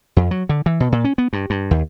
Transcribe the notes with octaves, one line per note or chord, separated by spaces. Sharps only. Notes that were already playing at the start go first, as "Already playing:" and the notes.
F2
F#3
D3
E3
B2
A#2
C#4
B3
G2
G2
D#2